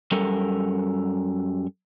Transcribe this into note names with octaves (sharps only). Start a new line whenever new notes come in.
F#2 G3 A4 A#4